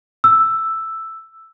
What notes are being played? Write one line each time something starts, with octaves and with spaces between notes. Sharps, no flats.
E6